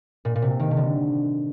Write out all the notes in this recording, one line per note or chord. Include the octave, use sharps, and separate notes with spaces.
A#2
A#2
C3
D#3
C3
D3